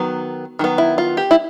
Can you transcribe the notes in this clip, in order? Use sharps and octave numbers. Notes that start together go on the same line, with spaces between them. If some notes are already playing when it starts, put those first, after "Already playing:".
Already playing: D#3 F#3 B3
D#3 F#3 B3
E4
F4
G4
E4